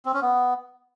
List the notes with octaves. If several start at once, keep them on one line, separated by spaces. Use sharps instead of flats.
C4
C#4
B3